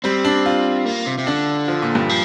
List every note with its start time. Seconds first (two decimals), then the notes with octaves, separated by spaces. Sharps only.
0.04 G3 C4
0.25 D4
0.46 F4
0.86 A#3
1.07 C3
1.18 C3
1.27 D3 D4
1.68 F3
1.82 A#2
1.95 G2
2.09 F3